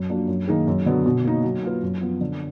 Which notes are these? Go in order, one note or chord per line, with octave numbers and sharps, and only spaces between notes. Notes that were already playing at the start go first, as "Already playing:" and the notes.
Already playing: F#2
F3 A#3 D4 F#4
F#2
D#3 A#3 D#4 G#4
F#2
D3 F#3 B3
B2
A#3 D#4
F#3
A#3 F4 B4
F#2
F3 B3
D3